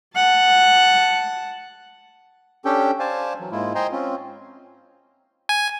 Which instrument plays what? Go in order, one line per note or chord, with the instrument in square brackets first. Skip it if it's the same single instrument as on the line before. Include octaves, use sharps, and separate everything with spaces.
[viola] F#5 A5
[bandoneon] C#4 D4 G4 A4 G5
C5 D5 F5 G#5 A5
E3 F#3
G#2 G#3 A#3 E4 F4
C5 D#5 G5 G#5 A#5 C6
C4 C#4 F4
[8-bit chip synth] G#5